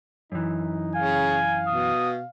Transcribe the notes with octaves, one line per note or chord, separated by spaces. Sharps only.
F#2 E3 D#4
C#3 F5 G#5
B2 D#6